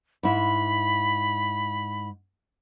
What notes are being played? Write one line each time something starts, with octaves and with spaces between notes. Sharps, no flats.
G#2 E4 B5